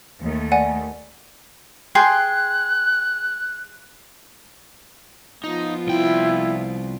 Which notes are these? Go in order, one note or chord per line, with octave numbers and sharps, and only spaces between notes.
D#2 A3
D5 F#5 G#5
G#4 G5 C6 F#6
F3 B3 D#4 F4
C2 E4 G5